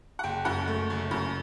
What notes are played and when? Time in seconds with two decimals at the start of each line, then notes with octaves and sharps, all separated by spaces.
0.19 F#5
0.23 F#1 G5
0.45 F#2 F#5
0.67 A3
0.90 F#1
1.11 F#2